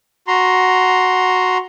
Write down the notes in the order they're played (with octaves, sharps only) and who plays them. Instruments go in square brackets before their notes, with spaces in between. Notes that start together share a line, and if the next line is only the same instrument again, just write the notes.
[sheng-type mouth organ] F#4 A#5 C6